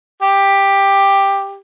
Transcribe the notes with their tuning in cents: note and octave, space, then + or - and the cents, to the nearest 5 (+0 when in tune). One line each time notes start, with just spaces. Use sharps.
G4 +10